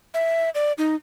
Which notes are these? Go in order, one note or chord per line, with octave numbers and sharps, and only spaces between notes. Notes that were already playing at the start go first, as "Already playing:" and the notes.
E5
D5
D#4